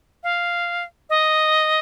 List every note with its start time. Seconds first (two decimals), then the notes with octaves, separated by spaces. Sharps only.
0.23 F5
1.10 D#5